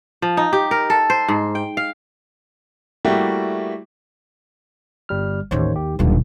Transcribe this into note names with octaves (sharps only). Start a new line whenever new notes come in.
F3
D#4
G4
A#4
A4
C5
G#2
G5
F5
G3 A3 A#3 E4 F#4 G4
G1 G3 F6
A1 D#2 D#4 C5 C#5
G4
D#1 B1 G2 A#2 D3